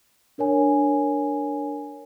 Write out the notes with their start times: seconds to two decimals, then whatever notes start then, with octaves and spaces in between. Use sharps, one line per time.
0.38 D4 A#4 C#5 G#5